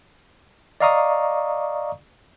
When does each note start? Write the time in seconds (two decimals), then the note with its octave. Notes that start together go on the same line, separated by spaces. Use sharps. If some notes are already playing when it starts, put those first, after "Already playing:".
0.80 D5 D#5 F5 A#5 C#6 D#6